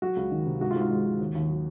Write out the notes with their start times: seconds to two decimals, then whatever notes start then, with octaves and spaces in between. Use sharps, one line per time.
0.02 F#3 F#4
0.16 C#2
0.31 D#3
0.46 C3
0.61 G#2 F#4
0.71 F4
0.76 G#2
0.81 F4
0.90 G#3 F#4
1.05 F3
1.19 D#2
1.35 D#2
1.49 F#3